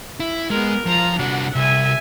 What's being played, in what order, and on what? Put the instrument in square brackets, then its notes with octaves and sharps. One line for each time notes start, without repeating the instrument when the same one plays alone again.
[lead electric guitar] E4
[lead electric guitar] G#3 [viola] B3 A#4
[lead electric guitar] F3 [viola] F4 A#5
[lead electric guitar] C2 F#4 [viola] D4 F#5
[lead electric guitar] C2 [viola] E5 G#5